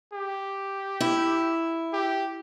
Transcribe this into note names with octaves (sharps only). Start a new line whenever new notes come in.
G4
E4
G4